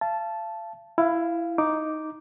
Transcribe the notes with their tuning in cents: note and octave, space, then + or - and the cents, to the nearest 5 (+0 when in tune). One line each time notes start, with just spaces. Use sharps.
F5 -40 A5 -10
E4 +15 F5 -10
D#4 +0 D6 +0